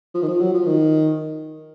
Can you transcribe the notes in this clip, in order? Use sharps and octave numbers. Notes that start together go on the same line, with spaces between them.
F3
D#3
F3
F#3
F3
D#3